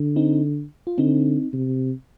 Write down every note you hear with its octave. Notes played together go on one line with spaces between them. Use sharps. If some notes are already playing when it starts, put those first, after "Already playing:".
Already playing: D3
C4 D#4
F4
D3 C4 D#4
C3